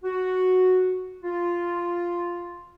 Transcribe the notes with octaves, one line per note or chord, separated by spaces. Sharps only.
F#4
F4